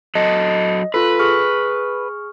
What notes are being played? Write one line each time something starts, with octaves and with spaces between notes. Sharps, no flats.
F#3 A4 D#5
F4 A4 B4
G#4 C#6 F6